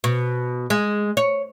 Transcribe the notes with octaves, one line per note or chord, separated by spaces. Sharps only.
B2
G#3
C#5